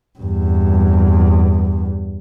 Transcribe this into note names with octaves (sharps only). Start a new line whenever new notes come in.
E2 G2